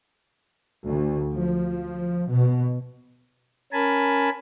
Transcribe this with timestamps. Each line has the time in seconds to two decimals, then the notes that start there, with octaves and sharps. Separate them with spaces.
0.88 D2
1.35 F3
2.31 B2
3.73 C#4 A#4 G#5 A5 B5